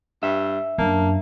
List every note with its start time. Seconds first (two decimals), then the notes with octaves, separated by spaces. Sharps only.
0.23 G2 E5
0.78 F#2 A#3 D4 A5